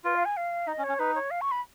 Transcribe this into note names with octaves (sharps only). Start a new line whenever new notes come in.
F4 B4
F5
G#5
F5
D#4 D#5
C#4
C#5
C#4
D#4 B4
C#5
F5
C#6
B5